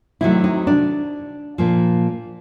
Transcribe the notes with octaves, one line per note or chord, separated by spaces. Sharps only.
C3 D#3 F#3 A3 E4
D#4
D4
A#2 F3 A#3